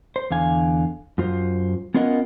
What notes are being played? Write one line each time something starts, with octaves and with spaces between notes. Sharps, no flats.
C5
E2 D3 F5 G#5
F#2 F4 C5
B3 C#4 F4 A#4 D#5 F#5